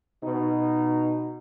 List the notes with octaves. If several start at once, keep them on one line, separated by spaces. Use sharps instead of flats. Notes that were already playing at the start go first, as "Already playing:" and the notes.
B2 D#4